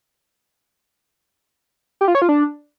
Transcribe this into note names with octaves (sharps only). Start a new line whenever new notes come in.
G4
F4
C#5
F4
D4